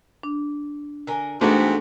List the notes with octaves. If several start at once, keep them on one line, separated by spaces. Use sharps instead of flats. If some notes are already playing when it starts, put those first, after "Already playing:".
D4
D3 A#4 G#5
G#2 E3 A3 B3 C4 D4 F#4